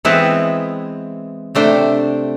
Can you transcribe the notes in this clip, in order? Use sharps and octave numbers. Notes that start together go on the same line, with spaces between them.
E3 G#3 B3 C4 E4
C3 A3 D4 C5 G5